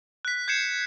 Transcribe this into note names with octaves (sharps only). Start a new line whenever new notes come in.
F#6 B6
G6 G#6 C7 C#7 E7